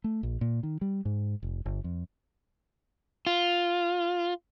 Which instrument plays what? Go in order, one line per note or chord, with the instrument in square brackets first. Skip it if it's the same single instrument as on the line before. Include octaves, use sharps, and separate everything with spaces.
[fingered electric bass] A3
A#1
A#2
D#3
G3
G#2
F1
G1
F2
[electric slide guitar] F4